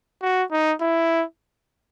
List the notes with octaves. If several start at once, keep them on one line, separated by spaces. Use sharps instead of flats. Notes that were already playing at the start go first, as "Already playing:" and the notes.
F#4
D#4
E4